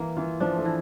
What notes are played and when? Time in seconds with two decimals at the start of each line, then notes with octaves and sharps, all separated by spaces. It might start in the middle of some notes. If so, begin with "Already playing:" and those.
Already playing: E3 A#3
0.17 E3 F4
0.40 F3 D4
0.57 A3
0.65 E3